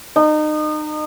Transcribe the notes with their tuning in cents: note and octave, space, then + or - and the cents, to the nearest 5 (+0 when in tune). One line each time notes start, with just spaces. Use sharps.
D#4 -30